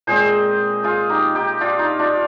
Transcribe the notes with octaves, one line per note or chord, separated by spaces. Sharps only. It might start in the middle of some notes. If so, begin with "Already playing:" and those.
A#2 G#3 C4 G#4 C5
F4 G#4
D#4 G4
D#4 G4
D4 F4
D#4
D4 F4